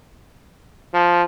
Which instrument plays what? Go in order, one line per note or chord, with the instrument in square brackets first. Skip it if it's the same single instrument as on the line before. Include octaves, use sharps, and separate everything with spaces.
[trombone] F3